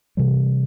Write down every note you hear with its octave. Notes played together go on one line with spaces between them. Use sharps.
C3 E3 G3